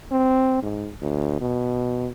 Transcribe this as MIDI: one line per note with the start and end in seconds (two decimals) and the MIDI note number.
0.11 0.58 60
0.63 0.89 44
1.02 1.38 38
1.41 2.09 47